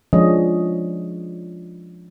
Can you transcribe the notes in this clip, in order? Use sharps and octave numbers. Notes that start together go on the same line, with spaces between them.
F3 G#3 C#4 D4 C#5 D#5